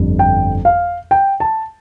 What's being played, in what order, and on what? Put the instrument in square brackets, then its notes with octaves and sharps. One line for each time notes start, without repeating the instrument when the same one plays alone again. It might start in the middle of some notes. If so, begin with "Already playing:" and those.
Already playing: [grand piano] G1 F2 D3 G3
G5
F5
G5
A5